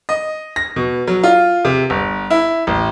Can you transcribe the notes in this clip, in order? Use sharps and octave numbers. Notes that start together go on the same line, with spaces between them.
D#5
A#6
B2
F#3
F4
C3
G1
E4
A1